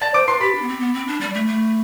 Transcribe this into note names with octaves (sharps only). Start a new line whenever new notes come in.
D5 A5 A6
C5 D6 D7
B4 C6 C7
G4 B5 B6
D4
B3
C4
B3
C4
D4
G3
A3
A3